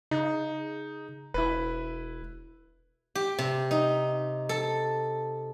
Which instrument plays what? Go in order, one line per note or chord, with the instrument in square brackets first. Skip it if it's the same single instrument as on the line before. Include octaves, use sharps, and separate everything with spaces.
[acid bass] C#3 [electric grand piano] D#4
[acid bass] E1 [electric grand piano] E4 B4
[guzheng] G4
C3
D#4
A4